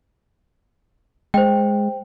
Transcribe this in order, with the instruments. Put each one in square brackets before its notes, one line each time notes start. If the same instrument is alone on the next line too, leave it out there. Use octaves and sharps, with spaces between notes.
[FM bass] G#3 [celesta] C5 G5